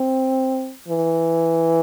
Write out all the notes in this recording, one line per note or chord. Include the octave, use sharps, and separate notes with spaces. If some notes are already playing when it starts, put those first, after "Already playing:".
Already playing: C4
E3